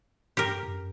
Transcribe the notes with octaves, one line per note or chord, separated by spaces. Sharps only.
G2 G4 A#4
F#2